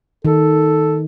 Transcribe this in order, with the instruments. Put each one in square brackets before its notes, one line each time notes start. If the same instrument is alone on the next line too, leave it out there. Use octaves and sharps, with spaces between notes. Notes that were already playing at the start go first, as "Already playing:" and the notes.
[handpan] D#3 [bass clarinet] A4